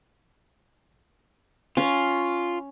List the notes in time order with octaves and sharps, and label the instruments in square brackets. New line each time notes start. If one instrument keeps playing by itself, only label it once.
[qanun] C#4 [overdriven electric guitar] F4